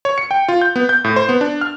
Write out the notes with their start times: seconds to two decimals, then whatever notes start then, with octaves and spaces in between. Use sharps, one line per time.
0.05 C#5
0.18 C#7
0.31 G5
0.48 F4
0.61 G6
0.76 B3
0.89 G6
1.04 A2
1.16 C5
1.29 B3
1.41 D4
1.61 F6